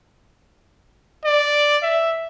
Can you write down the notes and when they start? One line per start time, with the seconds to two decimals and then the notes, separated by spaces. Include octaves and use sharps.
1.25 D5
1.82 E5